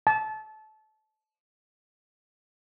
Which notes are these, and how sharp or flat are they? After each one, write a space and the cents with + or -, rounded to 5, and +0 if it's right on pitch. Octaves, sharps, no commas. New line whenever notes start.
A5 -25